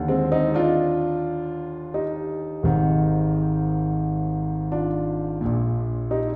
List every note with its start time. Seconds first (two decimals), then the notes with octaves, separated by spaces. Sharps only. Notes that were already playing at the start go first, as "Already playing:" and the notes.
Already playing: D#2 D3
0.08 G#3 C4
0.32 C4 D#4
0.54 D4 F4
1.94 D#4 G4
2.63 G#1 G#2 D#3
4.72 D4 F4
5.41 A#1 A#2
6.11 D#4 G4